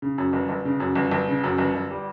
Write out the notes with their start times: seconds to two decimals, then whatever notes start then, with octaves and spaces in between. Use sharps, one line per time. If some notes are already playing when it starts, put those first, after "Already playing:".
0.02 C#3
0.18 F#2
0.33 G1
0.49 G1
0.65 C#3
0.80 F#2
0.95 G1
1.11 G1
1.28 C#3
1.44 F#2
1.58 G1
1.74 G1
1.90 G3